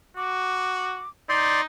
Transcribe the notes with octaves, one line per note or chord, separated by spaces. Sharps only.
F#4 D6
D#4 D5 C6 G6